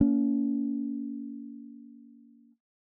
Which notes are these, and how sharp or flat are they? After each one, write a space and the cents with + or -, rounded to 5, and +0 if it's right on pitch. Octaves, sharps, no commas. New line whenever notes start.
A#3 +0 C#4 +35